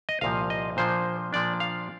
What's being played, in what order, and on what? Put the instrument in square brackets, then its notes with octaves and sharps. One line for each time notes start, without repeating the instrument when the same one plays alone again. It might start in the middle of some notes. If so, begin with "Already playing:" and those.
[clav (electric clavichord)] D#5
C2 A#2 F3 F5
D#5
A#2 F3 A#3 D4 C5
A#2 F3 A#3 D4 D5
F5